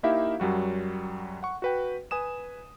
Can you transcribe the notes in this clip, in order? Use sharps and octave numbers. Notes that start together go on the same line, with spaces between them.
A#3 D#4 E4 G4 E5 F5
F#2 F#3 G3 F#4
F#5 C#6
F#4 B4 G5
B4 G#5 D#6 E7